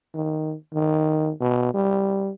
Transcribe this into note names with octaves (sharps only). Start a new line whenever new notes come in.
D#3
D#3
B2
G3